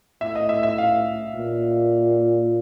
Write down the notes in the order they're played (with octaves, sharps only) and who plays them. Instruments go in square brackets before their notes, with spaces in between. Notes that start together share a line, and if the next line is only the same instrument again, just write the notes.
[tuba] A2 [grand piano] E5
[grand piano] D#5
E5
E5
F5
[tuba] A#2